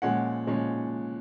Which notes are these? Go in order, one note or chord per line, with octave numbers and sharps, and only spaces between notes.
A#2 F3 G#3 C#4 F#5
A#2 F3 G#3 C#4